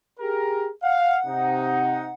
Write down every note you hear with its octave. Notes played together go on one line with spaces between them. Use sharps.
G4 G#4 A#4
F5 F#5
C3 D#4